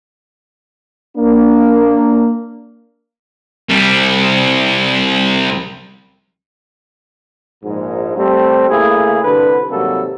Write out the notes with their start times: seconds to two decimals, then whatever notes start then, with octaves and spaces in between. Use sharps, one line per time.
1.17 A#3 D4
3.70 C2 G3
7.64 A#1 G#2
8.18 G3 A3 C4
8.70 C#3 A3 A#3 E4 G#4
9.24 C2 D3 B4
9.69 G#1 C3 F#3 G3 A#3 A4